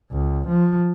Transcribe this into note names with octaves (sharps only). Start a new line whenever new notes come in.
C#2
F3